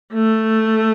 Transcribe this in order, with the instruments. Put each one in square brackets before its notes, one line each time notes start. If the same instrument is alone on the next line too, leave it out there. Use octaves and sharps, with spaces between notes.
[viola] A3